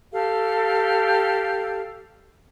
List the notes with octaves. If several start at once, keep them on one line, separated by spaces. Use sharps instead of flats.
G4 A4 F5